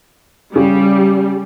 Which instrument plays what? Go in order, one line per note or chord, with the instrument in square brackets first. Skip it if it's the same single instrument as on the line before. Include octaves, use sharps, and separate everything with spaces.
[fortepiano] C#3 [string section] G3